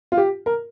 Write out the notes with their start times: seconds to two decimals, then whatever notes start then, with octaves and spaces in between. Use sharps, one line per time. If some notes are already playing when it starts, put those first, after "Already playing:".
0.12 F4
0.17 G4
0.46 A#4